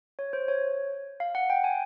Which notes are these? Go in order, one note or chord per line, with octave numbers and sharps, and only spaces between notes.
C#5
C5
C#5
F5
F#5
G5
G#5